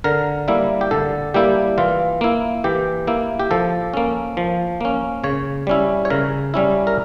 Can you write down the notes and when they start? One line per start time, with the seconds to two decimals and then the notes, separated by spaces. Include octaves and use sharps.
0.04 D3 A#4
0.48 G3 A#3 E4
0.81 G4
0.91 D3 A4
1.34 G3 A#3 E4 G4
1.78 E3 F4
2.21 A#3 E4
2.64 E3 G4
3.07 A#3 E4
3.40 G4
3.51 F3 A4
3.94 A#3 C#4
4.37 F3
4.81 A#3 C#4
5.24 C#3 C#5
5.67 G3 C#4 E4
6.05 C#5
6.10 C#3 A#4
6.54 G3 C#4 E4
6.87 A#4